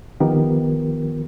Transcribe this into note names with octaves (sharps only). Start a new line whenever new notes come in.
D#3 F3 B3 F4 G4 A#4